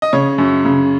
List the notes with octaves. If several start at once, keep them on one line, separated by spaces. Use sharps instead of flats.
D#5
C#3 C#5
F#2
C#3